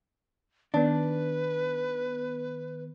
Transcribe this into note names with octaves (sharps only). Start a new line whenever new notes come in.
D#3 B3 D4 B4